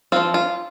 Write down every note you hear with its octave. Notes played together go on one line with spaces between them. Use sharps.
F3 C4 F4
F4